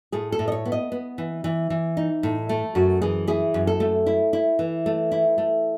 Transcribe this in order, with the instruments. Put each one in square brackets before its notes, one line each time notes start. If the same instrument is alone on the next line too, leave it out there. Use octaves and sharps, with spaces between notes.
[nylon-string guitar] A2 G#4
A4
A2
D#5
C#5
B3
D#5
B3
E3
E3
E3
D#4
A2
A3
F#2 F#4
E3 G#4
E4 G#4
F#2
A4
A3
E4
E4
E3
A3
E4
A3